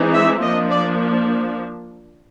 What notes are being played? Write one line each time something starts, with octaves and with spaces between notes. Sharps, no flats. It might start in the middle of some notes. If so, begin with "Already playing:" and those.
Already playing: E3 G#3 C4 D#4
E5
F3 A#3 D4 D#5
D5